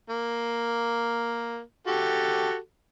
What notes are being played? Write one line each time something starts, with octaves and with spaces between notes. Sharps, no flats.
A#3
F#4 G4 A4